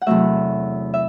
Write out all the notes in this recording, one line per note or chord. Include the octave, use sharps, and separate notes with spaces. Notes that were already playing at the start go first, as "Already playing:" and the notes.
F#5
E2 C3 F#3 A3 E5
E5